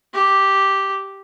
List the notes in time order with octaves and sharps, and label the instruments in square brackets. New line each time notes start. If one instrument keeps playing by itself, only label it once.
[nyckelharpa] G4